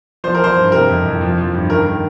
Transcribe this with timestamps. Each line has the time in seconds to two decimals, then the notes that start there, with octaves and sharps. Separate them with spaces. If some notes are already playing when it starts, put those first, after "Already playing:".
0.24 F3 C5
0.35 A#4
0.40 F3 C5
0.56 G2
0.72 C3 A#4
0.89 F2
1.06 F2
1.21 F3
1.38 F3
1.54 G2
1.70 D#3 A#4
1.86 D#3